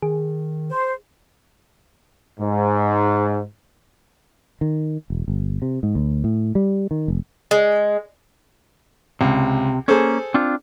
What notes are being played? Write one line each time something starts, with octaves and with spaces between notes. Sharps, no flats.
D#3 G#4
C5
G#2
D#3
E1
G1
C3
G#2
D2
A2
G3
D#3
F1
G#3
C#2 C3
A#3 C#4 G#4 A4 C5
C4 D4 F4